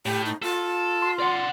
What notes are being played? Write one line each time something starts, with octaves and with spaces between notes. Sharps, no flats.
A2 G4
D#4
F4 A4
C6
D5 F#5